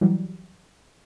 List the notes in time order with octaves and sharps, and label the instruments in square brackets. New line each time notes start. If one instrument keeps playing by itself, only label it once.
[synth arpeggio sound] E3 F#3 G3